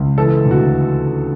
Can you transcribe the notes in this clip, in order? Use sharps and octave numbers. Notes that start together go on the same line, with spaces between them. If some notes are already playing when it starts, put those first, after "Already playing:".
Already playing: C#2
E3 A4
D2
F#4